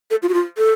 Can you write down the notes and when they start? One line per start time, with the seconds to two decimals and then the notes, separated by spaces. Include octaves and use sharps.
0.11 A4
0.23 F4
0.29 F#4
0.34 F4
0.58 A4